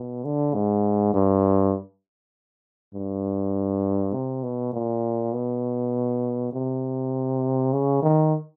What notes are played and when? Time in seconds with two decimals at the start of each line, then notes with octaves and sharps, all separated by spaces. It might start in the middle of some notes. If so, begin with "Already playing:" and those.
Already playing: B2
0.24 D3
0.54 G#2
1.14 G2
2.94 G2
4.14 C3
4.43 B2
4.73 A#2
5.33 B2
6.53 C3
7.73 C#3
8.02 D#3